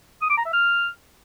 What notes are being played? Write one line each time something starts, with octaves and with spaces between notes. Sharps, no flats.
D#6
D6
A#5
E5
F6